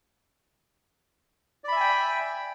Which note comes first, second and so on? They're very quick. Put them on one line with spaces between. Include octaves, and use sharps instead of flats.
D5 B5 E5 G#5 G5